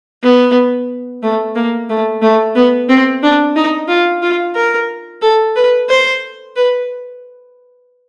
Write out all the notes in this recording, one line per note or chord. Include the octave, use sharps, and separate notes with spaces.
B3
A3
A#3
A3
A3
B3
C4
D4
D#4
F4
F4
A#4
A4
B4
C5
B4